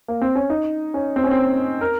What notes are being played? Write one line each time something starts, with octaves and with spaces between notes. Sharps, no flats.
A#3
C4
C#4
D#4
C#4
C4
C#4
C4
A#4